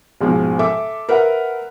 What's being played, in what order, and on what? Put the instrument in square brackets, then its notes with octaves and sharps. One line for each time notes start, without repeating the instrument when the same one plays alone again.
[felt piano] A#1 G#2 B2 F3
A4 E5 D6
A#4 B4 E5 F#5